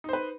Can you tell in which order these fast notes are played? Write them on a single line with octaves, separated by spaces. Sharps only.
D#4 C5 B4